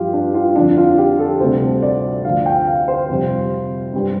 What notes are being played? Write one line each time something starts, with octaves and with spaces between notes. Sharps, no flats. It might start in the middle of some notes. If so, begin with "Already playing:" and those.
Already playing: G2 F3 F4 G4
D4
F4
F2 D3 F3 D4
F4
G4
A4
D2 C3 G3 C5
D5
D2 D3 F3 F5
G5
F5
C5
F2 C3 G3
G2 G3